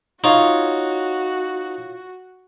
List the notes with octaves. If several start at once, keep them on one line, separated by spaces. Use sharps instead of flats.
D#4 F4 F#4 C#5